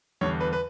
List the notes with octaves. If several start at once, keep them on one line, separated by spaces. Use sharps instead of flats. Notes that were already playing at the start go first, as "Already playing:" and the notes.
E2 D3 G3 C#5
B4
B4